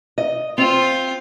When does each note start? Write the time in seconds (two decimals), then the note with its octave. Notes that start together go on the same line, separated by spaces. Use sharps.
0.18 D#5
0.58 C4 F4